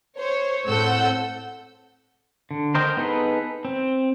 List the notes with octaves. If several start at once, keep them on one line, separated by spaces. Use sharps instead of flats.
C5 C#5
A2 C4 A4 F#5 E6 G6
D3
A#4 C5 D#5 G5
B3 D#4 G#4 A4 B4
C4